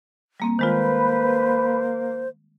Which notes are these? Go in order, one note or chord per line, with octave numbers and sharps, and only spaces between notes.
G3 A#3 C4
D#3 G#3 A#3 F4 B4 C5